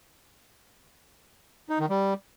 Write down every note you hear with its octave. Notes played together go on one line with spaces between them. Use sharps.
D#4
D#3
G3